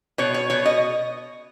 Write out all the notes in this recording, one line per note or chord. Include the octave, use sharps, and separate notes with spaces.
B2 C#5
C#5
B2 C#5
D#5